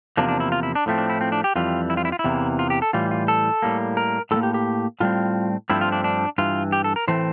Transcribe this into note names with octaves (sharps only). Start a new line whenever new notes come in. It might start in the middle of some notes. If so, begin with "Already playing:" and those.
E2 C3 F3 A#3 D4
D4
E4
F4
E4
D4
A2 F3 A3 C4
D4
E4
C4
D4
G4
F2 E3 G3 F4
E4
F4
E4
F4
E4
E2 C3 E3 A#3
F4
G4
A4
A2 E3 G3 F4
F4
A4
A2 G3 A#3
A#4
A2 G3 A4
A#3
G4
G4
A2 G3 C4 F4
G2 F3 A3 C4 E4
F4
D4
D4
G2 E3 F4
G4
A4
A#4
A2 E3 A3 C4 C5